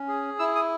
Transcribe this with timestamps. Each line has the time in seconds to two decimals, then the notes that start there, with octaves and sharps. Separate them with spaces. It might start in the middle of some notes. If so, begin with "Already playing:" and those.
Already playing: C#4
0.08 G#4
0.39 E4 E6
0.55 D#6